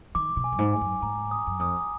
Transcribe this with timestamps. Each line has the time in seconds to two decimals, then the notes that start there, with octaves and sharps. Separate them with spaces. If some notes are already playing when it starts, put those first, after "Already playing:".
0.15 D#3 D6
0.37 B2
0.44 G#5
0.52 F#2
0.59 G#2
0.73 G#5
0.81 F#2
1.02 G#2 A#5
1.31 D#6
1.47 F#2
1.59 F2 D#6